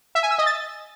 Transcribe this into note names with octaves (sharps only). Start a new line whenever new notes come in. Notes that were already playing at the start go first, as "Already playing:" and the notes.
E5
G#5
E6
D#5
A6